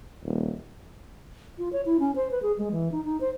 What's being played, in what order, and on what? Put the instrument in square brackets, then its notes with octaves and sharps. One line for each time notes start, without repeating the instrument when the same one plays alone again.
[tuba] D#1
[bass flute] F4
C#5
E4
C#4
C5
B4
G#4
G#3
E3
D#4
D#4
C5